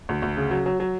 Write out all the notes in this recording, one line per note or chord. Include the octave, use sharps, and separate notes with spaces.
D2
D2
C#3
F#3
F#3
F#3